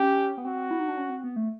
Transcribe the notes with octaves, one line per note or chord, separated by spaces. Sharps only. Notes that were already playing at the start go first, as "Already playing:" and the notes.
Already playing: C#4 G4
B3
C4 F#4
E4
D#4
D4
C#4
C4
B3
A3